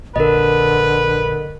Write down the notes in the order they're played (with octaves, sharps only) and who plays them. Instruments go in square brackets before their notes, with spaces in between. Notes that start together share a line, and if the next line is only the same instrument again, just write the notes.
[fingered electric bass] A#1 [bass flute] D3 [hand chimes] A#4 D#5 [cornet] B4